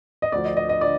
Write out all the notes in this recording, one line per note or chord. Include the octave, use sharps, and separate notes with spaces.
D#5
D2 D3 F3 D5
D#5
D#5
D#5
D3 F3 D5